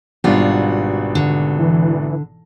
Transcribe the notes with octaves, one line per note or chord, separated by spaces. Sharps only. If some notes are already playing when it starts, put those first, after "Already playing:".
G#1 B2 G3 B3 D4 F4 F#4
D3
E3